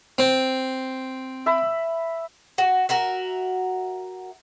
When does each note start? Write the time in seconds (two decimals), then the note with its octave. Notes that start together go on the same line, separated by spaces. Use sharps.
0.18 C4
1.46 E5 B5
2.58 F#4
2.89 F#4 A#4 E5